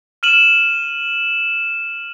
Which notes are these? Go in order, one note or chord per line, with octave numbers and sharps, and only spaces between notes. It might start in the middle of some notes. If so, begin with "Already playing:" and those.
F6 D#7 E7 F#7